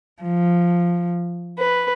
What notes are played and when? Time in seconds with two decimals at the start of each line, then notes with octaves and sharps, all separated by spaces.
0.22 F3
1.58 B4